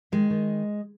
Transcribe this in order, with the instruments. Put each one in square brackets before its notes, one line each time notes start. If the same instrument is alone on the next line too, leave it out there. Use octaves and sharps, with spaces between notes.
[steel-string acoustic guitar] D#3 G#3
D#3